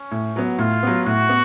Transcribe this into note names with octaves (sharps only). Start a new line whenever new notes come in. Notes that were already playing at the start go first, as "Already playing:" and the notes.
Already playing: C#4
A2
F#3 B3
A2 F4
F#3 B3
A2 F#4
B3